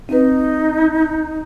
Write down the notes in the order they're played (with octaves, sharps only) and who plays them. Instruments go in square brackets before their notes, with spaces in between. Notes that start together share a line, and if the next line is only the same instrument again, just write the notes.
[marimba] C4 B4 [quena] D#4